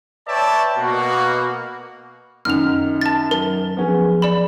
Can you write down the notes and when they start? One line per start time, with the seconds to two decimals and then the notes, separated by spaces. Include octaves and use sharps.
0.28 B4 C#5 D5 E5 G5 A5
0.77 B2 A#3 F#4
2.45 F#2 D#3 C#4 F6 F7
3.01 A5 A6
3.31 F#3 A#4
3.77 F3 B3 C#4 G#4
4.22 D5 B5 E7